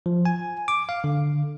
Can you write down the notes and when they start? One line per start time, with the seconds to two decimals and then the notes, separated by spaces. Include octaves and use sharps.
0.06 F3
0.25 G#5
0.68 D6
0.89 F5
1.04 D3